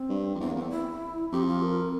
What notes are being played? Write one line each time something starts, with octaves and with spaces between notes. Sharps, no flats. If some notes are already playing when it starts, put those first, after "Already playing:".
Already playing: C4
G2
F2
E2 C4
A#3
E2
C4
E4
F2 G4
E4
F4
A#4